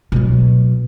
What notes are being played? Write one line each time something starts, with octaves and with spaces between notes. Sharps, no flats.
B2 F#3